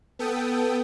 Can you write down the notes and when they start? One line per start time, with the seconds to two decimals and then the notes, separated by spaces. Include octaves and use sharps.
0.19 B3 A4 G5 D#6